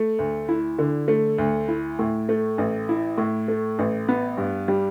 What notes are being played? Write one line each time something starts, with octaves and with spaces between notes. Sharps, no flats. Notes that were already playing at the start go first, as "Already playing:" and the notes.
Already playing: A3
D2
E4
D3
A3
D2
E4
A2
A3
A1
E4
A2
A3
A1
B3
G2
G3